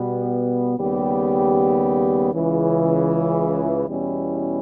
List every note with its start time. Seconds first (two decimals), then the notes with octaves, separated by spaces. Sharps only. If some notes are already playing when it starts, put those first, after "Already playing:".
Already playing: B2 G3 B3
0.77 D#2 C#3 G3 B3 G4
2.33 C#2 C#3 E3
3.88 E2 B2 G3 C#4 E4